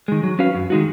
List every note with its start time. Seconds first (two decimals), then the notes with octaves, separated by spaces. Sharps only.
0.08 D#3 G#3
0.23 F#3
0.39 C#4 F#4 B4 F5
0.54 F#2
0.70 D#3 G#3 D#4 F#4